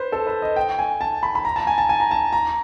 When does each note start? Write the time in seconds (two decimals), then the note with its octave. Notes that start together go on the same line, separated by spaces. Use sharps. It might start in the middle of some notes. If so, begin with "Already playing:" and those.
Already playing: B4 C5
0.12 A4
0.27 B4
0.42 D#5
0.56 G5
0.79 G#5
1.01 A5
1.23 B5
1.35 B5
1.45 A#5
1.56 A5
1.67 G#5
1.78 A5
1.89 G#5
2.00 A#5
2.11 A5
2.33 A#5